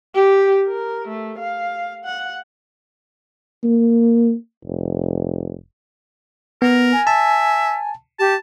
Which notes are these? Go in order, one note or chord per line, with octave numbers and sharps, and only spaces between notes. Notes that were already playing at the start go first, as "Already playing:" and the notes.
G4
A#4
A3
F5
F#5
A#3
F1
B3 A#4
G#5
E5 A5
G4 A5